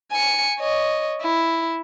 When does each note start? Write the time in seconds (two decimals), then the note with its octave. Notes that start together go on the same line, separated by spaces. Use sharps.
0.12 G#5 C#7
0.60 C#5 D#5
1.21 E4